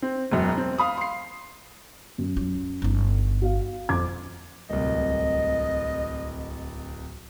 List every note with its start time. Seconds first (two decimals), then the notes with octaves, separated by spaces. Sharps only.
0.02 C4
0.32 E1 F#2
0.57 C4
0.78 F5 B5 D#6
0.97 C6 C7
2.18 F#2
2.36 F#3 F4
2.82 G1 D#4
3.42 F#4 F5
3.89 F2 D6 G#6
4.70 D1 C2 D#5